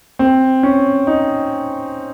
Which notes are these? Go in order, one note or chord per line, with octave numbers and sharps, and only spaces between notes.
C4
C#4
D#4